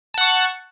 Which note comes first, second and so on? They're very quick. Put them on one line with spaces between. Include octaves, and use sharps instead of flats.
A5 F#5 C#6